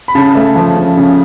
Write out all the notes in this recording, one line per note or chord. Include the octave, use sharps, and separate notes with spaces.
B5
C#3 A5
A3
F3
C#3
C#3